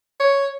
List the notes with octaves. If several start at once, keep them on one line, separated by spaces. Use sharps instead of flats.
C#5